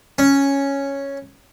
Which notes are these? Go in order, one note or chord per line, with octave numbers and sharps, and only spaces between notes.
C#4